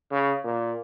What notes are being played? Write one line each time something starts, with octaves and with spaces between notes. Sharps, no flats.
C#3
A#2